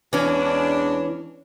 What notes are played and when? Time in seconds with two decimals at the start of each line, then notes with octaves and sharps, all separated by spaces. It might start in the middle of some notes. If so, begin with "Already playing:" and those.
0.13 E2 E3 G#3 C#4 D4